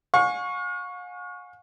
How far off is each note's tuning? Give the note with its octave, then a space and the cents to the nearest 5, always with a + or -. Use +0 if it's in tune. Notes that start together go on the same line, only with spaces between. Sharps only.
F5 +45 G#5 +0 C#6 +0